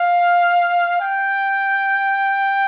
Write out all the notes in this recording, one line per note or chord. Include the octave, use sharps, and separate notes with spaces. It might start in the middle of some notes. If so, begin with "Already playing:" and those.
Already playing: F5
G5